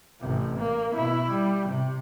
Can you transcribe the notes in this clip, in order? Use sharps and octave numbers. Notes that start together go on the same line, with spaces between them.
A1 C3
A#3
B2 E4
G3
C3